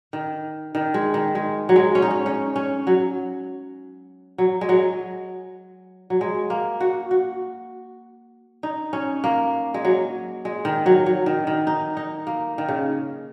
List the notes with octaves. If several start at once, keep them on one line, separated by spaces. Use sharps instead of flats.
D#3
D#3
G#3
D#3
G#3
F#3
G#3
C#4
D#4
C#4
C#4
C#4
F#3
F#3
G#3
F#3
F#3
G#3
A#3
F#4
F#4
D#4
C#4
A#3
G#3
F#3
G#3
D#3
F#3
F#3
D#3
D#3
D#4
D#4
A#3
D#3
C#3